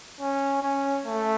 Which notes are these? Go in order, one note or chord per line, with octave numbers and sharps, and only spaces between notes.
C#4
C#4
A3